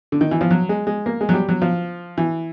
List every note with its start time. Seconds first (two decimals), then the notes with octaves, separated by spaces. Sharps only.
0.12 D3
0.21 D#3
0.31 E3
0.41 F3
0.51 F#3
0.69 G#3
0.87 G#3
1.06 A#3
1.21 G#3
1.29 F#3
1.34 G3
1.49 F#3
1.62 F3
2.18 E3